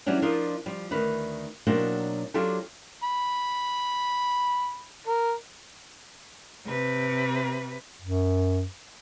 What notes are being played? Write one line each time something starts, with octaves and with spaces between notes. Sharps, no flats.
E3 F#3 G3 C#4 D4
F3 D4 F4 A#4 D#5
F3 G3
D2 D#3 B4
B2 F#3 A#3 C4 D4 D#4
F#3 D4 F4 G4 A4
B5
A#4
C3 B4
F#2